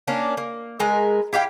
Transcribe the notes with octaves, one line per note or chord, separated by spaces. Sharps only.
A#3 C#4 D4
A#3
G#3 A#4 B4
E4 G4 F5 G5